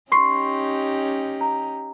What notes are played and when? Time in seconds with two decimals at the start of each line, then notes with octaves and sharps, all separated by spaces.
0.12 C#4 D#4 G4 C6 C#6 C7
1.41 A#5